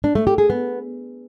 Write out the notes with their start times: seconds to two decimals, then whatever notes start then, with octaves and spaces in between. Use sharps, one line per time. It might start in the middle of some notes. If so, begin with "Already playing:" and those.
0.04 D4
0.15 A3
0.27 G4
0.38 G#4
0.50 B3